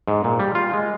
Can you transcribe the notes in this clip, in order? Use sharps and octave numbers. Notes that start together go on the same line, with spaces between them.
G#2
A#2
G3
F4
G#3